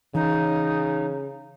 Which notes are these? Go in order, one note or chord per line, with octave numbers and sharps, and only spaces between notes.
C#3 E3 D#4